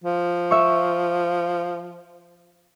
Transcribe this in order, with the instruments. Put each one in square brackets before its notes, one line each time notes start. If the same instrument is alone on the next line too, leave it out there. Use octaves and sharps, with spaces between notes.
[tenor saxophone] F3
[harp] E5 C#6